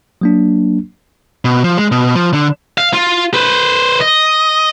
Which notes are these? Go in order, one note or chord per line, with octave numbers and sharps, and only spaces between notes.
F#3 A#3 D4
B2
F3
G#3
B2
F3
D3
F5
F4
B4 C5
D#5